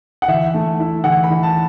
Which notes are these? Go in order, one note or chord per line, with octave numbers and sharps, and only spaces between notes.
F#5
E3 E5
A3
E4
E3 F#5
B5
E3
A5